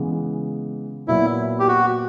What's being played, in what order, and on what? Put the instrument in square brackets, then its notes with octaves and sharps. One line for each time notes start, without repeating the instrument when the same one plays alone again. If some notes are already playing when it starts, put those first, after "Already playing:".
Already playing: [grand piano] C#3 E3 G#3 B3
[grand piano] A#2 F#3 B3 [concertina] E4
[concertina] G4
F#4